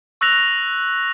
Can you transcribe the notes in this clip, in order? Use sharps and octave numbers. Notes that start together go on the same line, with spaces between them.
C#6 E6 F#6 A#6 F7